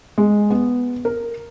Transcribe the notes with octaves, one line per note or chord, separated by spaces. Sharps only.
G#3
B3
A#4